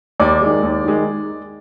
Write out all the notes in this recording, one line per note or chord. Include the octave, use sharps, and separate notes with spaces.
D#2 D5
D#3 G#3
D#2
D#3 G#3